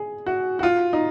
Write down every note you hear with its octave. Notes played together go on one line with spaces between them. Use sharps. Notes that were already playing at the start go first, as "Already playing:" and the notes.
Already playing: G#4
F#4
F#4
F4
D#4